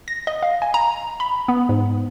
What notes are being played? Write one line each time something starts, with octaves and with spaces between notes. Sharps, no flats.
A#6
D#5
F5
G#5
A#5
B5
B3
G#2